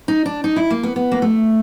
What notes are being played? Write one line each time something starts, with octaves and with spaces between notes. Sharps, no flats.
D#4
D4
D#4
E4
A#3
B3
B3
A#3
A3